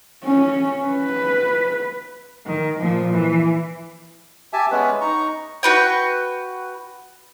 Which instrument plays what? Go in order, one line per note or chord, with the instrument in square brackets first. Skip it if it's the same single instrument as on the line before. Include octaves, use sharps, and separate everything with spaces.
[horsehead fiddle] C#4
B4
[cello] D#3
A#2 F3
E3
[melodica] G4 E5 G#5 A5
G#3 B3 C#4 B4
D#4 A#5 C#6
[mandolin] F#4 B4 G5